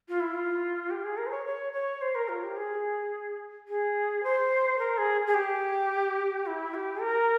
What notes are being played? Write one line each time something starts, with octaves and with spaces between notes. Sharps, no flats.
F4
E4
F4
G4
G#4
A#4
C5
C#5
C#5
C#5
C5
A#4
F4
G4
G#4
G#4
C5
A#4
G#4
G#4
G4
E4
G4
A#4